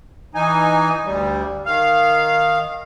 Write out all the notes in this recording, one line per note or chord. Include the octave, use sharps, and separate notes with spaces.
E3 D#4 G#5
D2 G3
D#3 F5